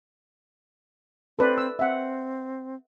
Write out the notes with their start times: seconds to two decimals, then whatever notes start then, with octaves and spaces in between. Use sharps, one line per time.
1.39 C4 A4 B4 D5
1.58 E6
1.79 C4 E5 F#5